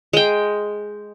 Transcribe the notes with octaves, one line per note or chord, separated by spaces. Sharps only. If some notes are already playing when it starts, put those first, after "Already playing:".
G#3 G5